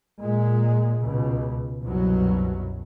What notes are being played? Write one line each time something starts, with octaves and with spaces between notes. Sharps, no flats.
A#2 G#3
C#2 B2
C2 F#2 B2 F#3